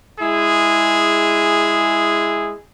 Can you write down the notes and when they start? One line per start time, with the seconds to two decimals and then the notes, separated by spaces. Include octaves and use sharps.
0.20 G#3 E4 G#4